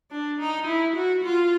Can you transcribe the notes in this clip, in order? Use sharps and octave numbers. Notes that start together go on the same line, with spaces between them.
D4
D#4
E4
F#4
F4